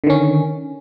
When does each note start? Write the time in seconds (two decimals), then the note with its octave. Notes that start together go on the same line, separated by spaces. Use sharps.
0.04 D3
0.07 D#3
0.10 C#4